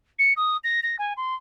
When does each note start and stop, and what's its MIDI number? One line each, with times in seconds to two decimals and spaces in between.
0.19 0.33 97
0.36 0.57 87
0.64 0.80 94
0.83 0.96 94
0.99 1.13 80
1.17 1.35 84